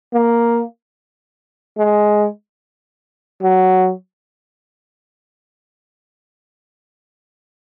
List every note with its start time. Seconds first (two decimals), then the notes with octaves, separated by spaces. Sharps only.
0.14 A#3
1.78 G#3
3.42 F#3